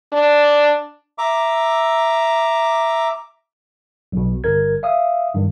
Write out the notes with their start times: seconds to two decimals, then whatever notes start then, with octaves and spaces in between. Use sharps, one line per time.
0.13 D4
1.18 E5 A#5 D6
4.12 B1 B2
4.44 G1 A#4 G#6
4.83 E5 F5 D#6
5.34 G2 D#3